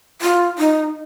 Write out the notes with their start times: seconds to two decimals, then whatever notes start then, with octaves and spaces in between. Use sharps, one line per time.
0.22 F4
0.58 D#4